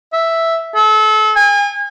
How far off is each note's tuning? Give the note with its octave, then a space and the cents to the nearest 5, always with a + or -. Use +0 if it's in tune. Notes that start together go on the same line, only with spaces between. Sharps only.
E5 +0
A4 -30
G#5 -35